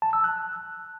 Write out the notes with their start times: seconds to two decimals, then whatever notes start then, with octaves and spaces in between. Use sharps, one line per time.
0.02 A5
0.13 E6
0.24 F#6